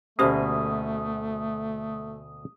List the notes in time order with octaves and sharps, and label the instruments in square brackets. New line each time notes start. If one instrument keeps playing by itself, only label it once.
[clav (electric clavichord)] D2 B2 A#3 [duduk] A3 [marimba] C#4 G4 C5 [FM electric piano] D#6